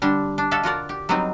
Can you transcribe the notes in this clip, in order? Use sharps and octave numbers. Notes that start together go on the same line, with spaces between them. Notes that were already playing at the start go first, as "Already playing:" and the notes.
D3 G3 D4
D4
F#4 A4 D5 E5 F5
F4 F#4 A#4 D5
G4
F#3 G3 B3 C4 D#4